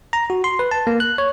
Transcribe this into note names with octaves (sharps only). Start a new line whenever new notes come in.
A#5
F#4
C6
B4
A5
A#3
F#6
C#5